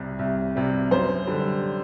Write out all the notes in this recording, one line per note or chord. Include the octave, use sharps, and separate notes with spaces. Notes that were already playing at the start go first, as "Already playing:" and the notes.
Already playing: C2 C3 G3
C2
C3 G3
F#2 C5
D3 G3